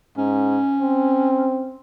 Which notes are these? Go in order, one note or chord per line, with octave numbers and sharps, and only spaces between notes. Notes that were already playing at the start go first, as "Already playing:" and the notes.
G#2 C#4
C4